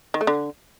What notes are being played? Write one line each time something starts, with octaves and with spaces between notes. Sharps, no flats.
D#3
A3
D3